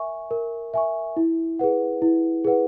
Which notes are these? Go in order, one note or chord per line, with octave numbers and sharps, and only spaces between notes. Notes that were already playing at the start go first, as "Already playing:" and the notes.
Already playing: A#4 E5 G#5 C#6
A#4
E5 G#5 C#6
E4
G#4 B4 F#5
E4
G#4 B4 F#5